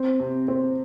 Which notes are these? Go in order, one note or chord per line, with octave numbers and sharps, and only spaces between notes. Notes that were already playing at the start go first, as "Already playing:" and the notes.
Already playing: C4
C3
C4